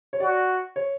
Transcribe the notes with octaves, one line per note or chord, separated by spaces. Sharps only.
C#5
F#4 D5
C#5